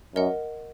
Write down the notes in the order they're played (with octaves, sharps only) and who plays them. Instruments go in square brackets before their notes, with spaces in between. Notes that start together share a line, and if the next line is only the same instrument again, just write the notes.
[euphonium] F#2 [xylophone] A#4 D#5 F#5